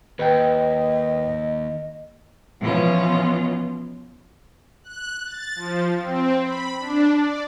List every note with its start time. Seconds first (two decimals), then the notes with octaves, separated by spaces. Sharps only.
0.19 D#2 B4 D#5 G5
2.60 B2 E3 F3 B3 C#4 F4
4.84 F#6
5.26 A6
5.55 F3
5.97 C4
6.42 B5
6.79 D4
7.12 D5